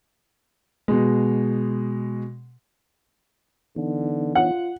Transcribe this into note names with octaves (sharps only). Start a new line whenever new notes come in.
B2 G#3
D3 E3 B3 D#4
F4 F#5